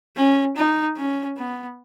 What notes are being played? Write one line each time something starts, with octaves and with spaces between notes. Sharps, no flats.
C#4
D#4
C#4
B3